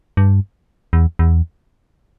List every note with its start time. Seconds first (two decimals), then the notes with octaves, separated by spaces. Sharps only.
0.17 G2
0.93 E2
1.19 E2